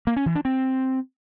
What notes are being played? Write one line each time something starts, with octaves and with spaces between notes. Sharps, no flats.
A#3
C#4
E3
D4
C4